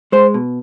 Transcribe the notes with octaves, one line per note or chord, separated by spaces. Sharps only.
G#3 C5
B2